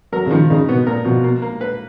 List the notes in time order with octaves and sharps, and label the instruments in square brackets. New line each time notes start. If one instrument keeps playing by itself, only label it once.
[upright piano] F#3 [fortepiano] A#4
[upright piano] C#3
[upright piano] D#3 [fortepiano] F3
[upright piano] C#3 [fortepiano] D#4
[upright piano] B2 [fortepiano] B3
[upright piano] A#2 [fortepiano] A#4
[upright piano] B2 [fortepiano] F3
[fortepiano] A#3
A#3
B4